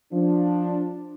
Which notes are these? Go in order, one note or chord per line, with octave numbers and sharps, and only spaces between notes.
F3 D4